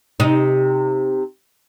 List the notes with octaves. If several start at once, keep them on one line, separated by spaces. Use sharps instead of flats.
C3 D#4